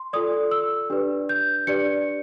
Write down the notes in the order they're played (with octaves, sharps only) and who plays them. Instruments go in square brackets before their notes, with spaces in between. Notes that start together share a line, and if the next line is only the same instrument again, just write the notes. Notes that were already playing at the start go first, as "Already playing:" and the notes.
Already playing: [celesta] C6
F4 A4 D5 D#6
E6
D4 G4 B4 D5
G6
D4 G4 B4 D5 C#7